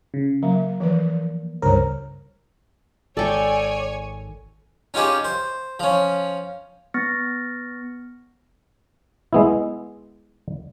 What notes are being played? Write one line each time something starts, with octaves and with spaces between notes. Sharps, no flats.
C#3
F#3 A#3
E3 F3 B4
C#2 G2 A#4 C5 C#5
G#1 D#3 G#3 A4 C#5 D5 G5 G#5
C#4 D#4 F4 G4 G#4
C5
F3 C#4
B3 C#6 F6 A6 A#6 C#7
G#3 B3 E4